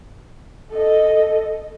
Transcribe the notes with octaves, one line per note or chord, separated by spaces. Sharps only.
A4 D#5